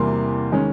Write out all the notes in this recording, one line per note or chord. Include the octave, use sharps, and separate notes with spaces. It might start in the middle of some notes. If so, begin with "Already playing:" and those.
Already playing: E2 C3 E3 G3 A#3 C6
D#3 G#3 C#4